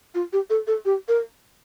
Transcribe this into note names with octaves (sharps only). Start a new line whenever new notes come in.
F4
G4
A4
A4
G4
A#4